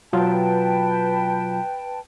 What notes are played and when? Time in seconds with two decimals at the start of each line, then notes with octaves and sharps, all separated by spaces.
0.13 B2 F#3 F4 B4 G5 A5